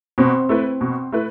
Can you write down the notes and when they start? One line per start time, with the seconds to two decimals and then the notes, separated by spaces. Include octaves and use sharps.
0.18 B2 C4
0.49 A3 E4 B4
0.81 B2
1.12 A3 E4 B4